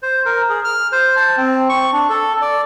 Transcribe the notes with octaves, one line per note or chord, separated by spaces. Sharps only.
C5
A#4
G#4
F6
C5
A5
C4
C#6
D4
A4
D5